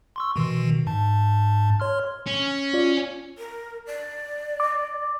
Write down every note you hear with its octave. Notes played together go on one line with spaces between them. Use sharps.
C6 C#6 E6
B2 D#3 E3
G#2 A5
C#5 C6 F6
C#4
F4 D5
A#4
D5
D6